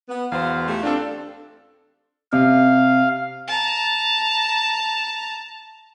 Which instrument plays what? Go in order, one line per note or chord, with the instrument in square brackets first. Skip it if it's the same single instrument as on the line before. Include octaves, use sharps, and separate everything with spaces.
[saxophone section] B3
[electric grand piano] E2 [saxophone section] B2 C5 F5
[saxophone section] A3 F4 G4
[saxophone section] C4 F4 [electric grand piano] D4 A4
[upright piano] C3 [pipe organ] F5
[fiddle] A5 A#5